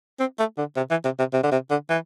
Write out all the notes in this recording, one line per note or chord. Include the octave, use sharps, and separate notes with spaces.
C4
A3
D3
C3
E3
C3
C3
C3
D3
C3
D3
E3